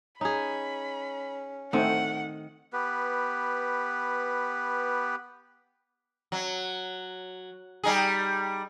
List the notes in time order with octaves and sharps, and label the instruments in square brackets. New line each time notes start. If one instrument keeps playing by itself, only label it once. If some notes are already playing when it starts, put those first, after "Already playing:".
[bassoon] C#4 [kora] D#4 G#4 [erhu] B5
[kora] D#3 [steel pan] A3 C4 [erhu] F#5
[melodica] B3 G4 B4
[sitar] F#3
G3 D#4 G#4